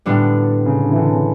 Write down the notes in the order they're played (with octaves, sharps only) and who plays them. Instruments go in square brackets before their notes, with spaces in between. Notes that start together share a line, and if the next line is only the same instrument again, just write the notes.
[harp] A2 G3 B3 D4 [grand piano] D3
[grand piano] C#3
D3
E3
D3
C#3